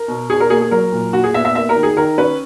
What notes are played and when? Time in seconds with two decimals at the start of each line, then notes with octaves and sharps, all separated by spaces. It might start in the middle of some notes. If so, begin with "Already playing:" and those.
Already playing: A#4
0.08 B2
0.30 B2 G#4
0.40 A#4
0.50 A#3 G#4
0.61 G#4
0.71 F#3 A#4
0.92 A#2
1.13 A#2 F#4
1.24 G#4
1.34 B3 E5
1.45 E5
1.55 A#3 E5
1.69 A#4
1.76 D#3
1.83 G#4
1.97 D#3 A#4
2.18 C#4 B4